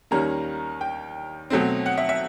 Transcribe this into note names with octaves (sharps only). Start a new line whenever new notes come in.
D#2 D#3 G3 A#3 C#4 A#5
G5
B2 F#3 A3 C4
F#5
E5
E5